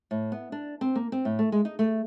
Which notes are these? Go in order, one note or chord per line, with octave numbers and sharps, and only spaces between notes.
A2
B3
D4
C4
A#3
C4
A2
A3
G#3
D#4
A3